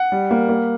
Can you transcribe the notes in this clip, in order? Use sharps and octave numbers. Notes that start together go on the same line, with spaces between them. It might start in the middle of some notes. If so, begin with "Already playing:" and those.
Already playing: F#5
G3
A#3
A#3